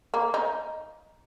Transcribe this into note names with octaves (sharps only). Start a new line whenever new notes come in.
A#3
D#4